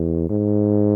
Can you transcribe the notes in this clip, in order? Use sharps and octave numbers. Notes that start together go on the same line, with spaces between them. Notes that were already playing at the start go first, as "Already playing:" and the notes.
Already playing: E2
G#2